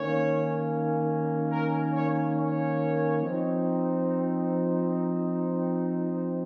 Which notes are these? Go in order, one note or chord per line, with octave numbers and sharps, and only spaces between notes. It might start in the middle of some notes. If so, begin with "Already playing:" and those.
Already playing: D#3 A#3 C#4 C#5
A#4
C#5
C#5
F3 C4 D#4